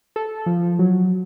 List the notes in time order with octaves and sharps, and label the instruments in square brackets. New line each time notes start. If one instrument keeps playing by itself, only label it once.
[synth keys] A4
F3
F#3